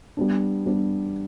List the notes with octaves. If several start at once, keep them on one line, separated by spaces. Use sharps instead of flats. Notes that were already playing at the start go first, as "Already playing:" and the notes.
G3 B3 D4
G3 B3 D4